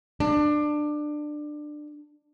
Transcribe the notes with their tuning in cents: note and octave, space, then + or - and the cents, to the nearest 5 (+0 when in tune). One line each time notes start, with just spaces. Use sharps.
D4 +20